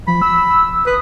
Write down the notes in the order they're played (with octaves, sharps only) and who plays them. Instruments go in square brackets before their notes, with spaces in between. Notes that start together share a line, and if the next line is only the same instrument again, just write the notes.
[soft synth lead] F3 [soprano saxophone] B5
[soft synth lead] E6
E6
[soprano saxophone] B4 [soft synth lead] D#6